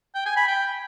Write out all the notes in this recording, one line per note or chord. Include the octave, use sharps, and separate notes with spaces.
G5
G#5
B5
G5